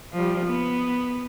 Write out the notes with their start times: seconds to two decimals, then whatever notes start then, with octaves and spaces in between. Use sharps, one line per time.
0.13 F3 G3
0.45 B3